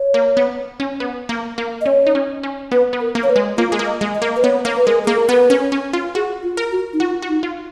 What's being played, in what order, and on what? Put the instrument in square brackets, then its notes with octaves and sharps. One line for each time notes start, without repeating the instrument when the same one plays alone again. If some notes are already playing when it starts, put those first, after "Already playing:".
Already playing: [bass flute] C#5
[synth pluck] A#3
B3
C#4
B3
A#3
A#3
[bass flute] D#5
[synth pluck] C#4 [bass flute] C#5
[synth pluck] D#4
C#4
C#4
[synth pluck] B3 [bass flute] B4
[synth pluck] B3
[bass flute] A#4
[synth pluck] A#3
[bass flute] C#5
B4
[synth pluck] G#3
[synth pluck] A#3 [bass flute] F4
[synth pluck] G#3
A#3
[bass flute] D#5
[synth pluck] G#3
[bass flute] D#5
[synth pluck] A#3
[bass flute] B4
[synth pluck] B3 [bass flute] C#5
[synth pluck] A#3
[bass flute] B4
[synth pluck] G#3 [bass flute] A#4
[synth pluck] A#3 [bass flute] G#4
[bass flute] A#4
[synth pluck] B3 [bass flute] B4
[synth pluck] C#4
C#4
F4
[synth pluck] F#4 [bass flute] G#4
[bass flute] F4
[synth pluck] A#4
[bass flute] F#4
D#4
[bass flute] F4 [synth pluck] F#4
[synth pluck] F#4
[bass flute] D#4
[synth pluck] F4